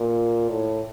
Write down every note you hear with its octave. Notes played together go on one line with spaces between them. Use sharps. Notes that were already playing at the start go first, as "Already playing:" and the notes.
Already playing: A#2
A2